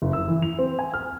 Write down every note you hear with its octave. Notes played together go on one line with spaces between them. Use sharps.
F#1
E6
E3
F7
C4
G#5
F6